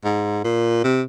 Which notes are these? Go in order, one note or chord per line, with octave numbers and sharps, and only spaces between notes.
G#2
A#2
C3